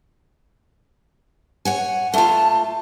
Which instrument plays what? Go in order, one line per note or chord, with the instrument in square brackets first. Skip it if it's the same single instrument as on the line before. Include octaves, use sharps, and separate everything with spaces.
[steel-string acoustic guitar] C#5 F#5 G#5
[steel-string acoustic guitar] A3 F4 [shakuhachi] A5